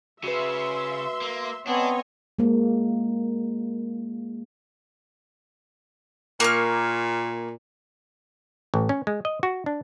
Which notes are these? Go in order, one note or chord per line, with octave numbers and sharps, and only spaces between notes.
C#3 F#4 B4 E5 C6
A#3
B3 C4 D4 C#5 D#5 G#5
G#3 A#3
A#2 A#3 C#6 F6
A1
C#4
G#3
D#5
F#4
D4